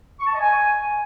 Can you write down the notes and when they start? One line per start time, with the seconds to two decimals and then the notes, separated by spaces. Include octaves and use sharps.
0.20 C#6
0.27 A5
0.34 D#5
0.40 G#5